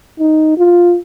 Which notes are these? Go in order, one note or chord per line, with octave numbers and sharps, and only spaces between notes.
D#4
F4